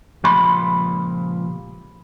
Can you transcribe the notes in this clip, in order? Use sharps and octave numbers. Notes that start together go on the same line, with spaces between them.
C#2 A#2 F3 G4 B5 C6